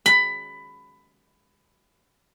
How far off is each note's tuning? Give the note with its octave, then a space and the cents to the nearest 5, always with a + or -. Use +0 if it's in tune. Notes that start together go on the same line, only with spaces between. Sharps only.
B5 +15